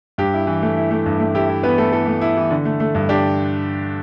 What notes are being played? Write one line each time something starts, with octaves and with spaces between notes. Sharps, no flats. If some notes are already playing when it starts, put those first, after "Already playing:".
G2 G4
E4
E3
A3
E4
A3
G2
A3
E4 G4
E4
E3 B3 B4
A3 A4
E3 A4
A3
E4
E3
D3
A3
A3
G2
D4 G4